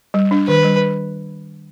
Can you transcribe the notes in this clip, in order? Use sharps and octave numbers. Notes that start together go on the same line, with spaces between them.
G3
D4
D#3 B4
G3